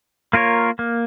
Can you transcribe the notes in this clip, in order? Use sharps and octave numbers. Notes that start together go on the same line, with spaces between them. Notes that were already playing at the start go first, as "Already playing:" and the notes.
A#3 F4 A#4 C#5
A#3